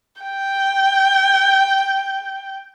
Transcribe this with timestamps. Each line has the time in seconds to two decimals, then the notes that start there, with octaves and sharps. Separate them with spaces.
0.22 G5